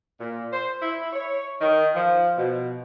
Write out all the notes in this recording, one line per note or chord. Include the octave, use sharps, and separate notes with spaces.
A#2
C5
E4
C#5
D#3
F3
B2